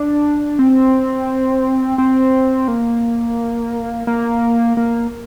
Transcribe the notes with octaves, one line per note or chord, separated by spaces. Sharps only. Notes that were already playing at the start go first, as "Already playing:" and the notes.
Already playing: D4
C4
C4
A#3
A#3
A#3